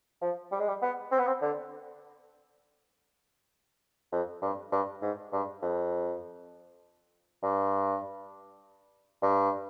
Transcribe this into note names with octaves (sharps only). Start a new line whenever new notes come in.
F3
G3
G#3
G3
B3
C4
B3
C4
D3
F2
G2
G2
G#2
G2
F2
G2
G2